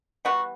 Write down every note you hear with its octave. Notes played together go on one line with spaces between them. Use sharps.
E3 G3 B3 F#4